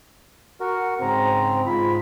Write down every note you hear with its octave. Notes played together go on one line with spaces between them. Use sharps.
F#4 A#4 F#5
G#2 C#3 C4 A#5
G#2 F4 B5